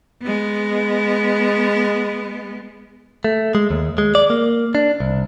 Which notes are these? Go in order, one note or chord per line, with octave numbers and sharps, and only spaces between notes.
G#3 B3
A3
G#3
D#2
G#3
D5
A#3
D4
C2